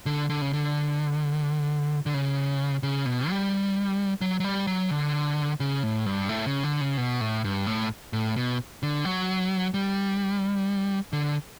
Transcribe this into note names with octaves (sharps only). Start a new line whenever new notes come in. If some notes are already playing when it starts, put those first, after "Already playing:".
D3
D3
C#3
D3
D3
C#3
C#3
B2
G3
F#3
F#3
G3
F#3
D3
C#3
A2
G2
A2
C#3
D3
C#3
B2
A2
G2
A2
A2
B2
D3
F#3
G3
D3